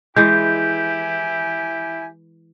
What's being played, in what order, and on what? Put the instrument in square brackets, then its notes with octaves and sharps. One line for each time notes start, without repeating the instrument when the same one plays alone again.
[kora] E3 G#3 [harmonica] E4 G#5 [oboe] G4 [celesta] G6